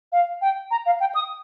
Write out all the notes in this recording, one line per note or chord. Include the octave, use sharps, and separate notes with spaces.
F5
G5
A#5
F5
G5
D#6